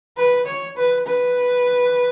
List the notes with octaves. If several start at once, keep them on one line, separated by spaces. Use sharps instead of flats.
B4
C#5
B4
B4